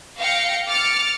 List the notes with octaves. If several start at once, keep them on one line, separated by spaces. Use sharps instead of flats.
F5 G5 A#6 C#7
D6 F6 A6 C#7